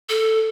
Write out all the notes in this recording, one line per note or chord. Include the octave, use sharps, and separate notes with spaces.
A4